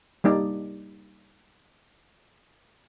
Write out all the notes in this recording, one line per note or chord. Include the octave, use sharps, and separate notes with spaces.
G3 A#3 D#4 D5